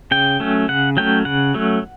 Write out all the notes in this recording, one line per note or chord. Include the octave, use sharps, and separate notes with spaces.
C#3 G5
F#3 A3 C#4
C#3 F#5
F#3 A3 C#4 G5
C#3 F#5
F#3 A3 C#4